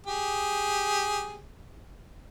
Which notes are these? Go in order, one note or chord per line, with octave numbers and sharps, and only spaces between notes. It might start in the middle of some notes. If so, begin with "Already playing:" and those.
G4 G#4